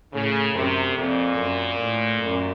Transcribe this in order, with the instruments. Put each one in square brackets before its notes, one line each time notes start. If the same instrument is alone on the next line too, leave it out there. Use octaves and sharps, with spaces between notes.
[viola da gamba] A2 [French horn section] C#3
[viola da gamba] F#2 [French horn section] C3
[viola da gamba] F2 [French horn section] A#2
[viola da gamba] F#2
A2
F#2